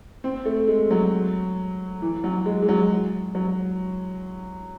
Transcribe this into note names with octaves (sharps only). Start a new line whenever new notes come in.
C4
A3
G#3
F#3
E3
F#3
G#3
G#3
F#3
F#3